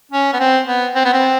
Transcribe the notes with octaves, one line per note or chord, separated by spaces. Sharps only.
C#4
B3
C4
B3
C4
B3
C4